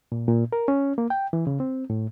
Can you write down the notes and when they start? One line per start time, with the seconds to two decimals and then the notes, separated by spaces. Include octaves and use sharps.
0.12 A#2
0.28 A#2
0.53 A#4
0.68 C#4
0.98 A#3
1.10 G5
1.33 E3
1.47 C#3
1.60 C4
1.90 A2